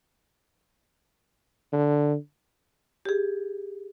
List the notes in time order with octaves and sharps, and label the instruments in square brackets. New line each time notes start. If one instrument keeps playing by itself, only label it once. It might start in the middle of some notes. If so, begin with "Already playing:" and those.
[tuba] D3
[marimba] G4 G#4